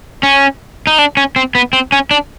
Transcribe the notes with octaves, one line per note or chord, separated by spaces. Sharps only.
C#4
D#4
D4
C#4
C4
B3
C4
C#4
D4